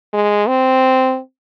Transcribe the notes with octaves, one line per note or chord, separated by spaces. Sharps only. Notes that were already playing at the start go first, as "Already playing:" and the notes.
G#3
C4